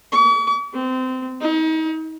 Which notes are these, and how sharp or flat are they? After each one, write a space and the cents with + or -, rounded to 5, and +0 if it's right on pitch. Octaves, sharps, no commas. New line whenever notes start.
C#6 +45
C4 -25
D#4 +40